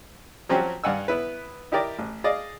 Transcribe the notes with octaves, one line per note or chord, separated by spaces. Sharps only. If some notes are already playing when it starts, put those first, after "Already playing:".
F3 F#3 C4 C#4 F#4 G4
G2 F5 F#5 G#5 E6
B3 E4 B4
D#4 E4 G4 A#4 D5 D#5
A1
G#4 D5 D#5 F5